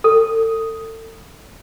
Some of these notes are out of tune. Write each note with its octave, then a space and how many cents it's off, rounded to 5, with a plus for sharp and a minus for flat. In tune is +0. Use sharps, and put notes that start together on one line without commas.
A4 +30